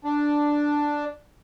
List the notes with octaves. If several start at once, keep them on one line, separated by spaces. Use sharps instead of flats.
D4